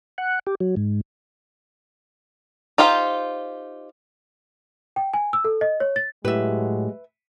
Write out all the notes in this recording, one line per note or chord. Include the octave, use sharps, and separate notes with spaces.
F#5
G4
F#3
G#2
D#4 F4 G4 C5
G5
G#5
E6
A4
D#5
C#5
A6
A2 F#3 G#3 A3 G4 B4 E5